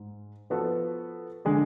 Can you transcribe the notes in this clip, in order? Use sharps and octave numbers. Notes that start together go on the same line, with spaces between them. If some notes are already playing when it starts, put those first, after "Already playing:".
Already playing: G#2 G#3
F3 B3 F#4 A4
D3 G#3 D4 G#4